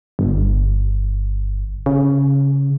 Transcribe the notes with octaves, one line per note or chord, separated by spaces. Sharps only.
G1
C#3